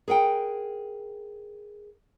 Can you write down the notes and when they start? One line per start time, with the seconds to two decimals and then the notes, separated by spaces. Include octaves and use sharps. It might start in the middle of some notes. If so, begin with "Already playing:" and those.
0.08 G#4 A#4 F#5 G5